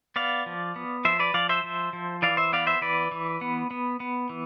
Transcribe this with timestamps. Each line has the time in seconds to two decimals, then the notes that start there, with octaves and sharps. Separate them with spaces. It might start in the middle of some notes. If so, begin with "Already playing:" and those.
0.16 B3 D5 F5
0.46 F3
0.76 B3
1.05 F3 C5 E5
1.19 B4 D5
1.34 F3 D5 F5
1.49 C5 E5
1.64 F3
1.93 F3
2.22 E3 D5 F5
2.37 C5 E5
2.53 B3 D5 F5
2.67 C5 E5
2.81 E3 B4 D5
3.12 E3
3.41 B3
3.71 B3
4.00 B3
4.29 E3